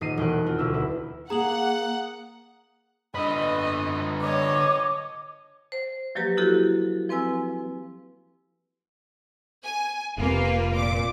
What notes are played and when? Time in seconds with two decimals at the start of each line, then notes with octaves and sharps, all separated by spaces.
0.01 D#1 D#4 C7 D#7
0.17 E1 G5 F#6
0.46 C4 F4
0.58 E1 D2 B2 E6
0.74 E4
1.30 A#3 G#4 F#5 A#5 D#6 F#7
3.15 D3 B4 D#5
4.21 C#5 D#5 D6
5.72 C5
6.15 F3 F#3 A#3 G4 B4
6.37 E4 F#4 G4 A4
7.09 F3 C4 B4 G#5 E6
9.63 G#5
10.18 F1 C3 A#3 F4 B4
10.74 A#2 D6